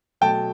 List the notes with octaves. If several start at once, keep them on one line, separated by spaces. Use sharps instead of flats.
B2 F#3 A3 G5 A5